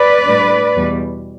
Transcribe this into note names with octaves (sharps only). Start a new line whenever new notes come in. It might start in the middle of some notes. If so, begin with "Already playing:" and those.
Already playing: B4 D5
A2 G3 D4
E2 B2 G3